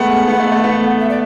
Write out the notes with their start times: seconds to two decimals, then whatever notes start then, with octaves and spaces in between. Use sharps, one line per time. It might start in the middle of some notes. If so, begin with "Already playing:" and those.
Already playing: G#3 A3 B3 F#5
0.28 B3
0.40 A3
0.52 A3
0.64 B3
1.00 E5
1.09 D5